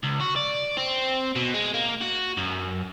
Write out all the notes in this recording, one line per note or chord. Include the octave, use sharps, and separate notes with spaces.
C#2
F#4
D5
C4
B2
G#3
A#3
F#4
F#2